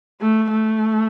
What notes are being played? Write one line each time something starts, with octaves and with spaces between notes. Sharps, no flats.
A3
A3